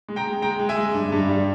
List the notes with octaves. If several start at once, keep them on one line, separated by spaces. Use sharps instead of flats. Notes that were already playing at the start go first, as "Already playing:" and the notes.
G#3
G5 A#5
G#3
G#3 G5 A#5
G#3
E5 G#5
G#3
G2
G2
G3